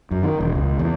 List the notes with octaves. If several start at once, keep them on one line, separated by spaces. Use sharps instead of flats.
F#2
D#3
E1
C#2
E2